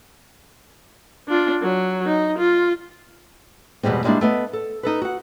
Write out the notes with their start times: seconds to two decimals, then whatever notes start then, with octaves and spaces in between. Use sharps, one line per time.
1.29 D4 F4
1.62 F#3
2.06 D#4
2.38 F4
3.83 E2 B2 G3 G#3 C4
4.04 G3 G#3 A#3 D4 E4
4.21 A3 B3 D#5
4.53 A4
4.83 D#4 A4 B4
5.02 F#4 F#5